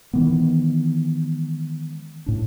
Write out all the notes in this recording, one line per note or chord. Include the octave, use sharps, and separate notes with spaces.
D#3 E3 G#3 B3
A2 D4